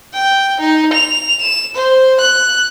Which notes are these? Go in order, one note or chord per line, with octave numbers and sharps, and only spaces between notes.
G5
D#4
F7
E7
C5
F#6